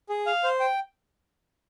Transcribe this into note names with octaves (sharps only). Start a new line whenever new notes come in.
G#4
F5
C5
G5